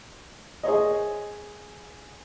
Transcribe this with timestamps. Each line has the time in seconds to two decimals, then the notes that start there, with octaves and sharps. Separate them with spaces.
0.63 G#4 C5 C#5 D#5